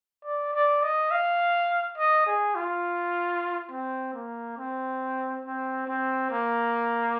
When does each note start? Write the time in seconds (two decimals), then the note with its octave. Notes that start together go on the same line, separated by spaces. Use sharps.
0.25 D5
0.54 D5
0.83 D#5
1.11 F5
1.98 D#5
2.26 G#4
2.55 F4
3.71 C4
4.14 A#3
4.58 C4
5.45 C4
5.87 C4
6.31 A#3